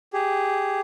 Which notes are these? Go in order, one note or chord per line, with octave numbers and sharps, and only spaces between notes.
G4 G#4